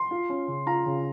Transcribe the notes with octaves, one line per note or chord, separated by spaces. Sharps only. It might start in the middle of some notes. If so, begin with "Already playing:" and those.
Already playing: C6
F4
C#4
C#3
F4 A#5
C#3